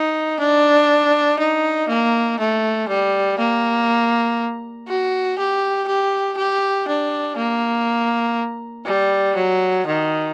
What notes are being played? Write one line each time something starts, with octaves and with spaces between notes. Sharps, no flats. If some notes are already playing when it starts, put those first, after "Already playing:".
Already playing: D#4
D4
D#4
A#3
A3
G3
A#3
F#4
G4
G4
G4
D4
A#3
G3
F#3
D#3